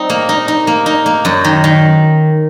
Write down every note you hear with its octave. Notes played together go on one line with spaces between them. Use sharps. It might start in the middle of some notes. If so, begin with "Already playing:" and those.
Already playing: G3 C4 D#4
A#3
D#4
D#4
A#3
D#4
A#3
F#2
D#3
D#3